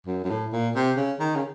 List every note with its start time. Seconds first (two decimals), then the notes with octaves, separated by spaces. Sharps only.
0.07 F#2
0.24 F#2
0.30 A2
0.53 A#2
0.75 C3
0.97 C#3
1.20 D#3
1.36 C#3